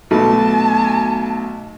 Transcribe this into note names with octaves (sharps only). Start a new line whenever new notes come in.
B1 A3 B3 A5